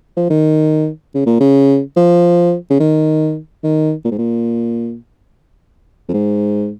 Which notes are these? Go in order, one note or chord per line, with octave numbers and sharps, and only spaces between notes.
F3
D#3
C#3
A#2
C#3
F3
C#3
D#3
D#3
A#2
G#2
A#2
F2
G#2